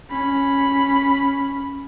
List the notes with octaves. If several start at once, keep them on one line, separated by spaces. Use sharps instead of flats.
C#4 B5